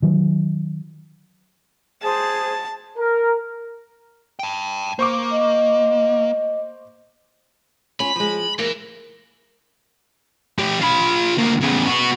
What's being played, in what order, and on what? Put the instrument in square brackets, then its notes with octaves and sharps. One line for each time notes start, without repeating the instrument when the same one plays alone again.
[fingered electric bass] D#3 F#3
[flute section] G#4 C5 [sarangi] A5
[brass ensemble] A#4
[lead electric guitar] G5 A5
[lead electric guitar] A#3 [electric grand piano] C5 C#6 D6
[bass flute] D#5
[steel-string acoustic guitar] C#4 F4 [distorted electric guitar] B5
[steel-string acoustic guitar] F3 G#3
[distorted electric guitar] E3 [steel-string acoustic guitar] A#3
[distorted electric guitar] A3 G4
F4 B5
D2 A#3
E2 C#3
B3 F#4